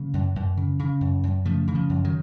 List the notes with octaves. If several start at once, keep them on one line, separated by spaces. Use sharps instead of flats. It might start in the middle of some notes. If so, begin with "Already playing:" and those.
Already playing: C#3 F#3 A#3
F#2
F#2
C#3
C#3
F#2
F#2
C#3 F3 A3
C#3
F3
F#2
D#3 F#3